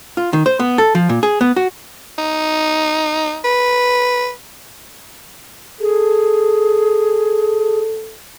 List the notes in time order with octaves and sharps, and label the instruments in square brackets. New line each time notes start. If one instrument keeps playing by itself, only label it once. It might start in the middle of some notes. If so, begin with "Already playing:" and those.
[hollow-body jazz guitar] F4
D#3
C5
B3
A4
F3
A#2
G#4
B3
F#4
[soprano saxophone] D#4
B4
[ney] G#4 [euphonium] A4